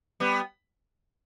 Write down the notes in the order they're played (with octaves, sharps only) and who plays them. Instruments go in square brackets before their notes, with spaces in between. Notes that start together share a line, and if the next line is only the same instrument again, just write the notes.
[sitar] G3 B3